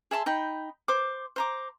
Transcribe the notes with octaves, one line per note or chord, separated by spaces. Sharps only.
G#4 E5 A5 C6
D#4 G5 B5
C5 D6
C5 A#5 D6